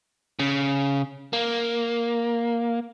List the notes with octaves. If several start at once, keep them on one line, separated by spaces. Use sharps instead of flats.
C#3
A#3